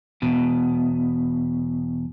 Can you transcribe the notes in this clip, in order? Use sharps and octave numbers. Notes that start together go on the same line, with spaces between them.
E2 B2